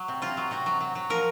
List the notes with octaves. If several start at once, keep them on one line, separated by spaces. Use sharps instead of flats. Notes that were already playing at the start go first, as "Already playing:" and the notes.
Already playing: F#3
C3
C3 F4
F#3
C3 F#4
F#3
F#3
F#3
F3 A#4